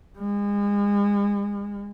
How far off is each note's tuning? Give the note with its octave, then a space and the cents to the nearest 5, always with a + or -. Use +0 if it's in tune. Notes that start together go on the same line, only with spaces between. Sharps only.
G#3 -35